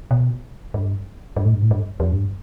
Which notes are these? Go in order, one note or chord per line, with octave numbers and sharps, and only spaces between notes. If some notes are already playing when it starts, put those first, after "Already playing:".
B2
G2
G2
A2
G2
A2
G2
F2
G2